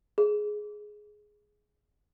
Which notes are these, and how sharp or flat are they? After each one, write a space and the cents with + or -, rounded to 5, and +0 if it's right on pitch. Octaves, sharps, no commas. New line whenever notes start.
G#4 +10